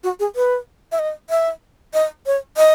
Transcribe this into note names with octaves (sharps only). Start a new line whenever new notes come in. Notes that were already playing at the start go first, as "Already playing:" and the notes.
F#4
G#4
B4
E5
D#5
E5
D#5
C#5
D#5